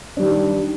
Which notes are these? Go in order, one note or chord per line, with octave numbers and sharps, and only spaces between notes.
D#3 G3 D4